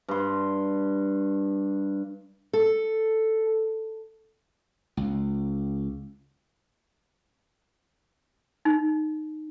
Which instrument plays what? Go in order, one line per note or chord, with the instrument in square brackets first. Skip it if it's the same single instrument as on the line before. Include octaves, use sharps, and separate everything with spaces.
[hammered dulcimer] G2 C6
[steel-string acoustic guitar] A4
[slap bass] C#2
[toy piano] D#4